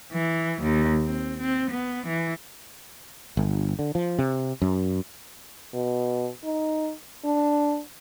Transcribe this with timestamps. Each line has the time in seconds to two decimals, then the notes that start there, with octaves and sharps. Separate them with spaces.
0.12 E3
0.62 D#2
1.04 C4
1.40 C4
1.70 B3
2.06 E3
3.37 G1
3.79 D3
3.95 F3
4.19 C3
4.62 F#2
5.73 B2
6.44 D#4
7.25 D4